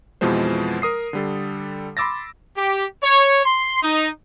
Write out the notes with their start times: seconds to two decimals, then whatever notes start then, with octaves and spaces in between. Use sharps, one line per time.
0.21 F2 B2 E3 F3 G#3 C5
0.82 A#4 D#6 C7
1.13 D3 G3 A4
1.97 B5 C6 D6 E6 A6 A#6
2.57 G4
3.03 C#5
3.46 C6
3.82 D#4